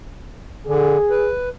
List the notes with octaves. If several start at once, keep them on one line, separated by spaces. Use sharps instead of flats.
D3 G#4
B4